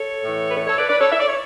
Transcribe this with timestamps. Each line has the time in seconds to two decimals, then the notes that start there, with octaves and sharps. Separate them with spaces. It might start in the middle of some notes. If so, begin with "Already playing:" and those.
Already playing: A4 C#5
0.23 A2 E3
0.51 B4
0.56 A4 C#5
0.67 A4 C#5
0.78 B4 D5
0.89 B4 D5
1.00 A4 C#5
1.11 E5
1.20 D5
1.28 C#5